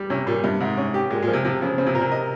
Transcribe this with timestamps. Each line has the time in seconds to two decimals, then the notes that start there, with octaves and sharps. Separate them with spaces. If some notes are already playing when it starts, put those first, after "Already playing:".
Already playing: G3
0.10 C3 C#4
0.27 A#2 G3
0.43 G2 C3
0.60 G#2 C3
0.77 C#4
0.94 G4
1.10 A#2 G#3
1.22 A#2
1.28 F3
1.33 C3
1.44 C3 F3
1.61 C#3 F3
1.78 C#3 C4
1.86 C3
1.94 A#2 A#4
2.01 C3
2.12 D#5